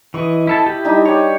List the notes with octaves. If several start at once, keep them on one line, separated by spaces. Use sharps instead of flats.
E3 D#5 C#6
E4 A4 A5
E4 G4
G3 D4 D#4
G4 C#5 D5